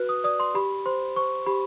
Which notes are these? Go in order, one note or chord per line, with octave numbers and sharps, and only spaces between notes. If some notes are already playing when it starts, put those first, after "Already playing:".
Already playing: F#4 B4 F#6
D#6
D5 D#6
C6
G4 B5
C5 C6
C5 C#6
G4 B5